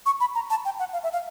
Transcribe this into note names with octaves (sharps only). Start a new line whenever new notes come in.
C#6
B5
A#5
A5
G5
F#5
F5
E5
F5